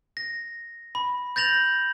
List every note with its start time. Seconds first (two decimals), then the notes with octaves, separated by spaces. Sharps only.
0.17 A#6
0.95 B5
1.36 G6 A6 A#6 F7 F#7